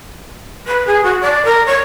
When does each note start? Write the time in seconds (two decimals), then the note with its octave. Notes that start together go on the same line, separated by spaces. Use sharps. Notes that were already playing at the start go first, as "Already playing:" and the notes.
0.67 B4
0.87 G#4
1.03 F#4
1.21 D5
1.44 A#4
1.66 C#5